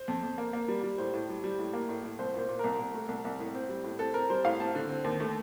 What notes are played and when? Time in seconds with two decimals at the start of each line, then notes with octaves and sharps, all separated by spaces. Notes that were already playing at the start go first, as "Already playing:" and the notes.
Already playing: C5
0.08 F2
0.23 F2
0.38 A#3
0.53 A#3
0.68 G3
0.83 G3
0.98 A2 C5
1.14 A2
1.29 G3
1.44 G3
1.59 A2
1.73 A#3
1.89 A2
2.04 A2
2.19 C2 C5
2.34 A#2 C5
2.49 A#2
2.59 C2 A#4
2.79 C2
2.94 A3
3.09 C2
3.25 C2
3.39 A2
3.55 C4
3.69 G3
3.84 A2
3.99 C4 A4
4.14 C4 A#4
4.30 G3 C5
4.44 A2 F5
4.59 C4 A5
4.75 D3
4.89 C4
5.04 D#2
5.20 A3